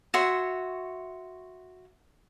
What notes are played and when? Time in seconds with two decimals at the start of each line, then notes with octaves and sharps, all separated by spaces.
0.14 F#4 C#5 E5 C6